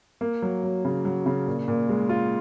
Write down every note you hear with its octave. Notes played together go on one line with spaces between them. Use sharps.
A#3
F#3
F#3
C#3
F#3
C#3
A#2
A#2
G#3
F4